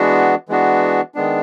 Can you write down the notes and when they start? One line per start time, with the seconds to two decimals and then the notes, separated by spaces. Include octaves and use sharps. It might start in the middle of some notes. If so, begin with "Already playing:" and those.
Already playing: E3 G#3 B3 D4 F#4
0.48 E3 G#3 B3 D4 F#4
1.15 D#3 G#3 B3 D4